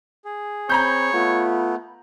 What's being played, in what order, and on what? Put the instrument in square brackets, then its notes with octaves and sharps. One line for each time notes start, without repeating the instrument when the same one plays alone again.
[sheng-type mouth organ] G#4
[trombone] C4 [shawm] C#5 [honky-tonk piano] A#5 B5 G6
[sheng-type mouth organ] A3 B3 [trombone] F4